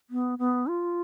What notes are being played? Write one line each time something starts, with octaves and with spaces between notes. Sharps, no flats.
B3
B3
F4